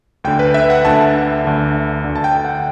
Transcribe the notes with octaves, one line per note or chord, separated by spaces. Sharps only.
D2 D3 G5
B4
E5
F#5
D2 D3 A5
D2 D3
D2 D3
A5
G5
F#5